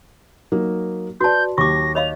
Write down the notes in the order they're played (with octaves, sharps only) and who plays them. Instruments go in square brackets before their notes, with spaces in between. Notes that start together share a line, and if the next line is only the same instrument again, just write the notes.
[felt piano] F#3 A#3 D#4
[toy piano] F#4 A5 [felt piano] B4 D5 [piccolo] G6
[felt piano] D#2 [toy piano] C#6 D6 [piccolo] A#6
[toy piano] C#5 D#5 F5 [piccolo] F7